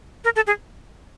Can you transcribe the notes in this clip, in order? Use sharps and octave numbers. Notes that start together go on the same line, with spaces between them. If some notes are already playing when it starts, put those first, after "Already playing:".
A#4
A4
G#4